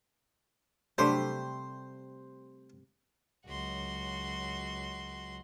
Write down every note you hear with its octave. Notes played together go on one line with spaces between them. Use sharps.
C3 F#3 G3 A3 D4 C5
C#2 F#3 F#4 C6